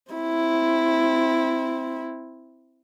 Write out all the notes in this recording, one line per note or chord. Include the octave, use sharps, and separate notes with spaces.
C4 E4